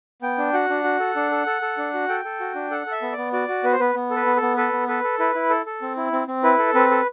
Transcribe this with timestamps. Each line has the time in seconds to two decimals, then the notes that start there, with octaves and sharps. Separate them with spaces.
0.22 B3 G5
0.38 D4
0.53 F#4 F#5
0.69 D4
0.84 F#4
1.00 A4
1.16 D4
1.31 A4
1.46 A4
1.62 A4
1.78 D4
1.94 F#4
2.09 A4 G5
2.25 A4
2.40 F#4
2.55 D4
2.71 A4 F#5
2.86 A4
2.91 E5
3.02 B3
3.12 D5
3.18 B3
3.33 F#4 D5
3.48 F#4
3.64 B3 B4
3.72 C5
3.80 B3 B4
3.95 B3
4.10 A4
4.16 B4
4.26 B3
4.36 A4
4.42 B3
4.57 A4 B4
4.73 B3
4.88 A4 B4
5.04 A4
5.19 E4 B4
5.35 E4
5.50 A4
5.66 A4
5.82 C4
5.97 E4
6.12 C4
6.28 C4
6.43 E4 B4
6.59 A4
6.74 C4 B4
6.91 A4